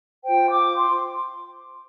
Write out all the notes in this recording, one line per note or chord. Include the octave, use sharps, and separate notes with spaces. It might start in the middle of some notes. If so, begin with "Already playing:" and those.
F4 C5 G5
D6
C6